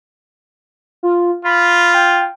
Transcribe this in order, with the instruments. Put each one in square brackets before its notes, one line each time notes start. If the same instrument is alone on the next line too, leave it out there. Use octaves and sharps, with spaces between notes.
[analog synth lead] F4
[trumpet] F4 [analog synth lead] B5
[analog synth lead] G5